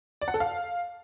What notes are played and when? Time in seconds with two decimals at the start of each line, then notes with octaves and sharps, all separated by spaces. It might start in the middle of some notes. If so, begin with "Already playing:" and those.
0.21 D5
0.28 F#5
0.34 A4
0.40 F5